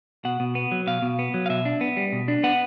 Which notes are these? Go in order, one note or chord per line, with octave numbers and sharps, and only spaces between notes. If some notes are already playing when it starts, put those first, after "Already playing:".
B2 F#5
B2
B3
F#3
B2 F5
B2
B3
F#3
F5
B2 E5
D4
B3
G3
B2
D4
B3 F#5